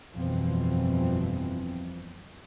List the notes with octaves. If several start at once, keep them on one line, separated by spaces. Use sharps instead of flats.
G1 F2 B2 E3 F3 C4